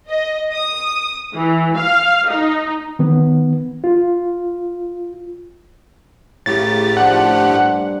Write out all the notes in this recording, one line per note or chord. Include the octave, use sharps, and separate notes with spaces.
D#5
D#6
E3
F5
D#4
D#3 B3
F4
A2 C#3 A3 A#3 G4 A6
F3 D4 F#5
G2